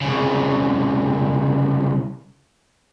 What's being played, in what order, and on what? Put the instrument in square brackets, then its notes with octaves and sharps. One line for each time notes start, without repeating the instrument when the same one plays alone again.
[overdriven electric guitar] C2 C#3